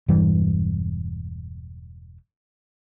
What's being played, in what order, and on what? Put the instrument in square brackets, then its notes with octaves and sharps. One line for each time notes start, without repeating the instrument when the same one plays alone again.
[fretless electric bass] E1 G2 E3 G3